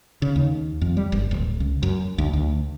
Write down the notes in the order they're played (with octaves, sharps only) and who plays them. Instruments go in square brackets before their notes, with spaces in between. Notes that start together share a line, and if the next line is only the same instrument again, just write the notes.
[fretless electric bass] C#3
D#2
F2
G3
G1
D1
C#2
F#2
D2
D2